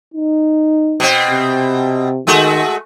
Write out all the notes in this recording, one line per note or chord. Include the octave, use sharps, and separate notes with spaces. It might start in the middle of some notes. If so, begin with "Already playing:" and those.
D#4
B2 C4
C3
D#3 G#3 A3 F#4